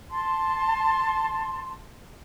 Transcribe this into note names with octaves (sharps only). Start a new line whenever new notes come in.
A5 C6